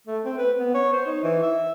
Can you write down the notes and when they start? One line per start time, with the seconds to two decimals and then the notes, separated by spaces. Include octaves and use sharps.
0.07 A3
0.25 C4
0.38 B4
0.60 B3
0.74 C#5
0.93 C5
1.06 D#4
1.23 E3
1.43 E5